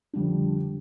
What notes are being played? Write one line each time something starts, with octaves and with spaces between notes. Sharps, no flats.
F2 D3 G3 D4